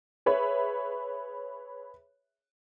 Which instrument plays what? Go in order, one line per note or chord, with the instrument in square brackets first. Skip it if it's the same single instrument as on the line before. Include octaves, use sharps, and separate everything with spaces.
[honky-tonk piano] G#4 B4 C#5 E5